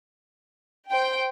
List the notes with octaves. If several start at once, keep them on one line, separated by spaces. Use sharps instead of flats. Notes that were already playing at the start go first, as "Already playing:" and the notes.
C5 G5